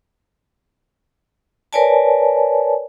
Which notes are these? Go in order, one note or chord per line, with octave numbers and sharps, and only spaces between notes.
A#4 B4 C#5 D5 G#5 A5